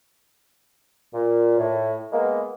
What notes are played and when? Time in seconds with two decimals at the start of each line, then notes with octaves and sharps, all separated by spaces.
1.14 A#2
1.58 A2
2.12 G#3 A#3 B3